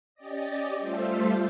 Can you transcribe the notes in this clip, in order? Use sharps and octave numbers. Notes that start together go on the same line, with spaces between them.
C#4 G4 D5 D#5
G3 A3 F4 A4 C5 E5